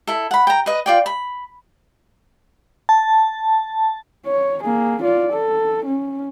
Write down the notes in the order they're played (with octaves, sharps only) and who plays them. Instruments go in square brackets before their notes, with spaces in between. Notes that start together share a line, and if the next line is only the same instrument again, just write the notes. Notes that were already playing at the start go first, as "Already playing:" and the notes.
[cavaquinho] E4 A4
F#5 B5
G5 A#5
B4 D#5
F4 D5 G5
B5
[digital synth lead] A5
[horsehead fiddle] C#5
A#3 G#4
F4 D5
A4
C#4